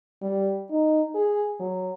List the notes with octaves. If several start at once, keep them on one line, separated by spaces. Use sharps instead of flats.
G3
D#4
G#4
F#3